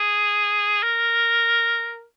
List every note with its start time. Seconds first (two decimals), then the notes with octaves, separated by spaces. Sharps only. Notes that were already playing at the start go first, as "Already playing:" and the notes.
Already playing: G#4
0.83 A#4